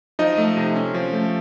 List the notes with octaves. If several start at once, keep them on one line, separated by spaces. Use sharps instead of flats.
F3 D#4 D#5
A3
C3
C#4
F3
A3